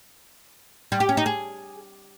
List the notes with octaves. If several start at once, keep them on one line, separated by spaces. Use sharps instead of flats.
G3
G4
C#4
D#4
G#4